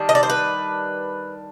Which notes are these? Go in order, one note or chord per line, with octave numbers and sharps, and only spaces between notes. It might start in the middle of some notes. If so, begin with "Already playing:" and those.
Already playing: D#3 G3 D4
D#5
D5
C5
B4